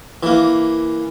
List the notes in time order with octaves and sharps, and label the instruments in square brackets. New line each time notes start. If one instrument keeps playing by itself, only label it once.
[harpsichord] E3 A#3